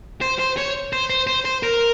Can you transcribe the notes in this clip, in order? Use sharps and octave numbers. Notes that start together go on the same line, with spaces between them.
C5
C5
C#5
C5
C5
C5
C5
A#4